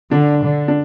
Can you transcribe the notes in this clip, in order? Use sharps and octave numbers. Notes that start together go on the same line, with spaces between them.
D3 D4
D3
D4